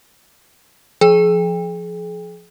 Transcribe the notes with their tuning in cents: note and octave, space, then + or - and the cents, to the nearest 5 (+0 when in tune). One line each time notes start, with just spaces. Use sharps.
F3 +0 G#4 +35 G5 +35